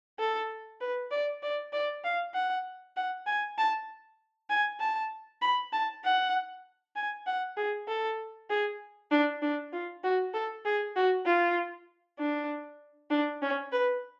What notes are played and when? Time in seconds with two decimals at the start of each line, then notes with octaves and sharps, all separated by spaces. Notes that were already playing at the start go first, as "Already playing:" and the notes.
0.19 A4
0.81 B4
1.11 D5
1.43 D5
1.73 D5
2.04 F5
2.34 F#5
2.97 F#5
3.26 G#5
3.58 A5
4.50 G#5
4.80 A5
5.42 B5
5.73 A5
6.04 F#5
6.96 G#5
7.27 F#5
7.57 G#4
7.88 A4
8.50 G#4
9.11 D4
9.42 D4
9.73 F4
10.04 F#4
10.34 A4
10.65 G#4
10.96 F#4
11.26 F4
12.19 D4
13.11 D4
13.42 C#4
13.72 B4